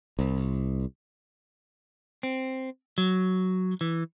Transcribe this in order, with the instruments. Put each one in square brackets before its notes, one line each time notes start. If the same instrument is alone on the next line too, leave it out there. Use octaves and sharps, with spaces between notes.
[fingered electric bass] C2
[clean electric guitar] C4
F#3
E3